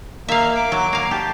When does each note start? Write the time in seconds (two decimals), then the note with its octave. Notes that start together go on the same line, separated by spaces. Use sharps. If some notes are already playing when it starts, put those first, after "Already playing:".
0.28 A#3 E5 F5
0.55 D6
0.72 F#3
0.93 A#3 F5
1.11 G4 A5